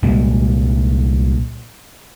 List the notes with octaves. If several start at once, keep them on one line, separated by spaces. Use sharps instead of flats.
C2 A#2 G3 G#3